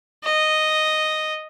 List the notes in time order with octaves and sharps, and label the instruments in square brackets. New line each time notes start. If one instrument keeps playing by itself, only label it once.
[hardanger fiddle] D#5